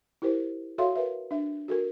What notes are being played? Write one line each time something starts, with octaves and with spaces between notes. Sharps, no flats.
E4 G4 A#4 C5
F#4 A4 C#5 E5 F5 C6
A#4 B4 E5
D4 E5
F#4 A4 A#4